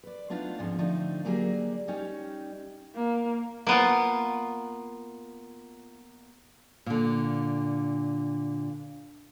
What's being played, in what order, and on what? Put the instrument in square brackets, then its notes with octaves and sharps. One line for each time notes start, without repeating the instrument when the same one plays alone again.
[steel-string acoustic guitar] B4 D5
A3 B3 D4 D#4 F4 F5
D2 G#2 D3 F3 C4
D3 F3 A3 C4 D4 D#4
F#3 G3 A#3 G#4 A#4 D5
G3 C#4 D#4 G4
[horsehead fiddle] A#3
[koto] A#3 B3 F4
[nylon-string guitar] A#2 D3